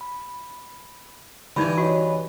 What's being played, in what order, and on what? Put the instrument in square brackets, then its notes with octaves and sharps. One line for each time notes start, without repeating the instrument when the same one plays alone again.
[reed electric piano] B5
[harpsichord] G2 E3 [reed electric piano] D3 G6 G#6 [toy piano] D#4 G4 B5
[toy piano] F#4 [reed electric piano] C#5 D#5 B5